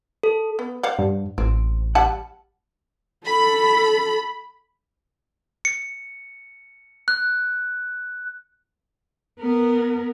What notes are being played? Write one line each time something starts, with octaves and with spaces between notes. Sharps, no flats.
A4
B3
C5 F5 F#5
G2
A1 C4
G3 F#5 A5
A4 B5
C#7
F#6
B3 A#4